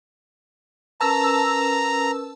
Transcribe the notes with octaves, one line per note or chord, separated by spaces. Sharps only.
C#4 A#4 B4 A5 A#5 E6